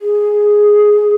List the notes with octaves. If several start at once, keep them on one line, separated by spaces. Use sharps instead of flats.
G#4